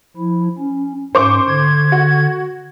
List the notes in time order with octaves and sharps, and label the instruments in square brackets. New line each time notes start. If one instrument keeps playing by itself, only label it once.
[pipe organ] F3 E4
C#4
[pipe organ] G#2 C#4 [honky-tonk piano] C5 C#6 D6
[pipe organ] D3 G#6
[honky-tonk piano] F#4